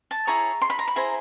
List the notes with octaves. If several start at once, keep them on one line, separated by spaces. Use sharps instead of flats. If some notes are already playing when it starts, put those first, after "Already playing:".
A5
E4 G#4 C#5 A#5
C6
B5
A#5
B5
E4 G#4 C5 A#5